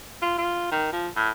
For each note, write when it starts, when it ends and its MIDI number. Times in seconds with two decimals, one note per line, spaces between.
0.22 0.36 65
0.38 0.67 65
0.71 0.89 51
0.92 1.08 53
1.16 1.30 45